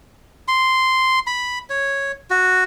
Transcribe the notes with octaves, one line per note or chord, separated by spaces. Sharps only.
C6
B5
C#5
F#4